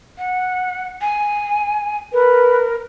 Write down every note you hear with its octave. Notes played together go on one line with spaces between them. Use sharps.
F#5
G#5
A#4 B4